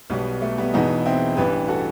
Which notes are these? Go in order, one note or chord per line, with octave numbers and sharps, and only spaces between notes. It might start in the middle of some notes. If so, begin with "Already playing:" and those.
B1 B2 G3 B3
A3
G3 B3
E1 E2 B2 B3 D#4
C4 E4
A1 G2 E3 G4 B4
F#4 A4